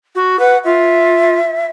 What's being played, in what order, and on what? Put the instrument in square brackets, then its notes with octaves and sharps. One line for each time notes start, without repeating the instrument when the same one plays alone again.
[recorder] F#4
[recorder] B4 [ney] F#5
[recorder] F4 [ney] E5